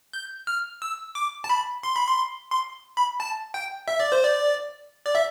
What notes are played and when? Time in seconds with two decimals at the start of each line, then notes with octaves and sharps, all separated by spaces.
0.13 G6
0.47 F6
0.82 E6
1.15 D6
1.44 A5
1.49 B5
1.83 C6
1.96 B5
2.08 C6
2.51 C6
2.97 B5
3.20 A5
3.54 G5
3.88 E5
4.00 D5
4.12 C5
4.24 D5
5.06 D5
5.15 E5